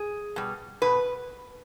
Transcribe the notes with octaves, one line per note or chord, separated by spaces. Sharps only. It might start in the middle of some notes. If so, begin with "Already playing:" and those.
Already playing: G#4
B2 G3
B2 B4